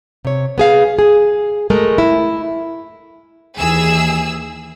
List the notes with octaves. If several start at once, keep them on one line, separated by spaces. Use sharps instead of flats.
C3 C#5
B3 G#4 F5
G#4
G#3 A3 A#4
E4
D#2 E3 G#4 E6